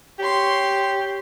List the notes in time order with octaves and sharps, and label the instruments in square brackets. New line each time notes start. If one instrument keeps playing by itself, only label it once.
[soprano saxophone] G4 [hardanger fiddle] C#5 C6